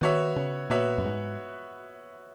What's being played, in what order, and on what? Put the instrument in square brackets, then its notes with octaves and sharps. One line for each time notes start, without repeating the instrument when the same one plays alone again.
[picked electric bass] D#3 [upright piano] B3 F#4 C#5 E5
[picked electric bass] C#3
[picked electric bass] A#2 [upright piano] B3 F#4 C#5 E5
[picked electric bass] F#2
G#2